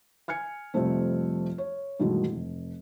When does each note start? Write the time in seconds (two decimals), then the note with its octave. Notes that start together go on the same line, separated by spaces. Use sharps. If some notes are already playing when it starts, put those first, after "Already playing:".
0.28 G#5 F6 G#6 C#7
0.74 F2 C3 F3 G3 A3 C4
1.58 C#5
2.00 G2 B2 D#3 E3 G#3 A3
2.32 F1